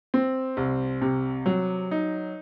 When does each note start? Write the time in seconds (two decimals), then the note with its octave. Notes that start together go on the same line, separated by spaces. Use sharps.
0.14 C4
0.57 C2
1.02 C3
1.46 F#3
1.91 D#4